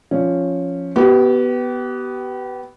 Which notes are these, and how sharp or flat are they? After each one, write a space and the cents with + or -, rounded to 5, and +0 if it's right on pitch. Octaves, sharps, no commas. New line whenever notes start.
F3 +0 C#4 +0
B3 +0 G4 -35